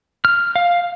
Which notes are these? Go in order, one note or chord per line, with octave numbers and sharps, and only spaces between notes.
F6
F5